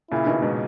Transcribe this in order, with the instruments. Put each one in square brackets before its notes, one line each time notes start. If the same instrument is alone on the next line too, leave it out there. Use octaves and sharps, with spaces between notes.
[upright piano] A#2 C#3 [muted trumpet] E4
[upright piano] B2 D#3
G#2 B2